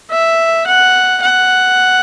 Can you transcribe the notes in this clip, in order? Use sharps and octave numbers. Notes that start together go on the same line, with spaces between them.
E5
F#5
F#5